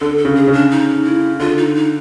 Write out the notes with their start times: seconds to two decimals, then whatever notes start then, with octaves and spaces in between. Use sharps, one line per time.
0.01 D3 A4
0.18 A4
0.25 C#3
0.36 G#4
0.47 C#3
0.53 D4
0.71 D#4
1.05 E4
1.40 D3 F4
1.58 D#4
1.75 D#4